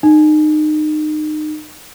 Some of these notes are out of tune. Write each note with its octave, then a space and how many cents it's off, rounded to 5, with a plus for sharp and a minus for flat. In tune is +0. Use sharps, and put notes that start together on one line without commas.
D#4 -30